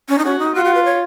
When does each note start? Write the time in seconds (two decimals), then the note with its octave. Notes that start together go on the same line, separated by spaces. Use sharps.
0.09 C#4
0.18 D#4
0.25 C#4 F#4
0.39 D#4
0.54 F4 F#4
0.65 F#4
0.75 B4
0.85 C#5